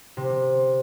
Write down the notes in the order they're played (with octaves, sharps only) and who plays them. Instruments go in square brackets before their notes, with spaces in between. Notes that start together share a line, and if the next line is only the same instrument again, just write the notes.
[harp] C3